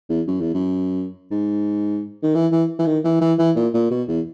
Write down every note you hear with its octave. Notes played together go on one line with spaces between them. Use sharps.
E2
F#2
E2
F#2
G#2
D#3
E3
E3
E3
D#3
E3
E3
E3
A#2
A#2
B2
E2